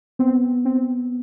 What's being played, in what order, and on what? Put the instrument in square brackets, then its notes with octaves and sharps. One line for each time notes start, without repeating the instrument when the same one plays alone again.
[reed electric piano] B3 [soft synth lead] C4
[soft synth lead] C4